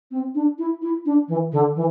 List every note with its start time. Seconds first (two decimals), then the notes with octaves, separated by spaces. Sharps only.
0.11 C4
0.35 D4
0.59 E4
0.82 E4
1.06 D4
1.28 E3
1.52 D3
1.75 E3